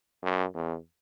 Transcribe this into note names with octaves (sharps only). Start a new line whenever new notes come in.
F#2
E2